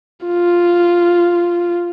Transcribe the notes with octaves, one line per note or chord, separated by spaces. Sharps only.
F4